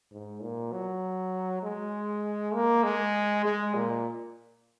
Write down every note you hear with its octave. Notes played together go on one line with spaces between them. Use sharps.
G#2
A#2
F#3
G#3
A#3
G#3
G#3
A#2